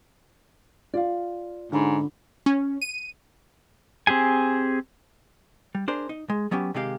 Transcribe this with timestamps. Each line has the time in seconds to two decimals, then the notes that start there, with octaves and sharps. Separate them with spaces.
0.94 F4 D5 F5
1.72 G#2 D3 C#4 B5
2.46 C#4
2.81 D#7
4.07 C4 G4 G#4 G#5
5.75 G3
5.88 D4 G#4 A#4 C5
6.09 D#4
6.30 G#3
6.51 F#3 B3 C#4 G4
6.74 C3 D#3 G#3 G4 F5